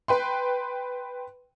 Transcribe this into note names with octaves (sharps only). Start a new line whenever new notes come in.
B4 G5 C6